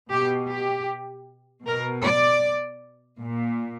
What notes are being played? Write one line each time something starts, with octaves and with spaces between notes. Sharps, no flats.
B2 G4
G4
B2 A#4
D5
A#2